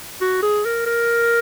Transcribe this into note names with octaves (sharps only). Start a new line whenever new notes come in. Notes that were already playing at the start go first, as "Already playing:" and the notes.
F#4
G#4
A#4
A#4